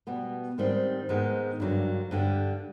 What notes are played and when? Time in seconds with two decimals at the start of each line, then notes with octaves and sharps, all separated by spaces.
0.07 B2 G3 B3
0.58 G#2 D#3 G3 C4
1.09 G#2 D#3 G#3 B3
1.60 G2 D3 F#3 A#3
2.11 G2 D3 G3